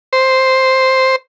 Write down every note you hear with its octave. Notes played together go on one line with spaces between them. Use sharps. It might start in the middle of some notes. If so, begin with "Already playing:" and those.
C5